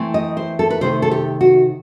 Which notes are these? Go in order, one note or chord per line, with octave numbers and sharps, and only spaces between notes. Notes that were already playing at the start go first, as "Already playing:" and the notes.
Already playing: E3 A3 C4 E4
D#5
C5
A4
B4
C3 D#3 A3 C5
A4
G4
F#4